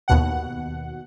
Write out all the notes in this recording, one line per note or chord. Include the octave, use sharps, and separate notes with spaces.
D#2 B2 F#5